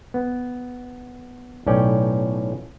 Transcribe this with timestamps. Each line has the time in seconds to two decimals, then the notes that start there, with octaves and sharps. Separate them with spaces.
0.14 B3
1.66 B1 A2 C#4 D5 G5